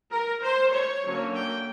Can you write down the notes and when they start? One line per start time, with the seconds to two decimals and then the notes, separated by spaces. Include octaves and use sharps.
0.10 A#4
0.42 C5
0.73 C#5
1.03 D3 F#3 A#3 C#4
1.35 G5